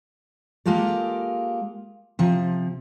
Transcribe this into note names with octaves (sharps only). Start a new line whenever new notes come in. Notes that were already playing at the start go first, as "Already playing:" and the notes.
G#3 A#3 F4 G4 A4
C3 F3